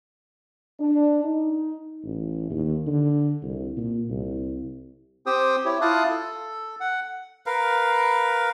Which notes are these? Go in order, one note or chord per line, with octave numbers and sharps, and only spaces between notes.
D4
D#4
A1
D#2
D3
C2
A#2
C2
C4 G4 C5 G5 D#6
E4 G4 C#5
E4 F4 F5 A5 D#6 F#6
A4
F#5
A#4 B4 F5